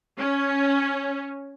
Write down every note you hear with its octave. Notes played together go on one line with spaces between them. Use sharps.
C#4